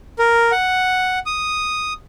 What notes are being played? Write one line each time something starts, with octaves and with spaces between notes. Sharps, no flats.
A#4
F#5
D#6